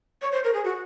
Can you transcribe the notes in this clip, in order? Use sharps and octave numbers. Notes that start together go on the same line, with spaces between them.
C#5
C5
A#4
G#4
F#4